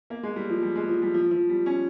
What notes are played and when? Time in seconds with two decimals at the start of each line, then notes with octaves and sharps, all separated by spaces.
0.10 A#3
0.23 G#3
0.36 G3
0.50 F3
0.63 G3
0.76 G#3
0.89 F3
1.02 G3
1.14 F3
1.31 F3
1.49 G3
1.66 C#4